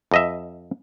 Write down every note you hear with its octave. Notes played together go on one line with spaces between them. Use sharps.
F2 D#5 E5